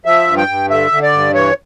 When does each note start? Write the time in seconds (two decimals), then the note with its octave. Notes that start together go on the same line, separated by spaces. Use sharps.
0.05 F3 E5
0.27 G2
0.37 G5
0.48 G2
0.70 D3 E5
0.91 D3
1.03 D5
1.13 G2
1.34 E3 C#5